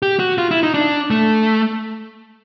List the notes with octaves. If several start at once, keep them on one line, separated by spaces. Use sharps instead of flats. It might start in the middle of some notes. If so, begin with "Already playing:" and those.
G4
F#4
F4
E4
D#4
D4
A3